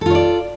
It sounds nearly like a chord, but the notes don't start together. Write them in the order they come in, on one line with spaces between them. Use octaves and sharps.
A4 F4 C#5 D5